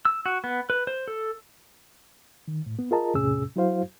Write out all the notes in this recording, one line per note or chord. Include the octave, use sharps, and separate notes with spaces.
E6
F#4
B3
B4
C5
A4
D#3
A2
B3
F4 G#4 A#4 D#5 A5 A#5
E2 A2 C3 C#4 G#4 E6
F#3 E4 F#4 C5 F5